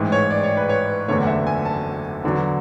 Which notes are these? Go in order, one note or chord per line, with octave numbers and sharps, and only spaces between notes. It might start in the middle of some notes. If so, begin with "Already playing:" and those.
Already playing: A1 G#2 E3
C#5
D5
C#5
B4
C#5
F#1 E2 D3 A3 C#5
F#5
E5
G#5
A5
E2 D3 F#3